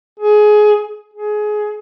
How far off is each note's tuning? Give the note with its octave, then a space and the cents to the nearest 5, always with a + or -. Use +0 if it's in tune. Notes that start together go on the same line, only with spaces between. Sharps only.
G#4 +20
G#4 +20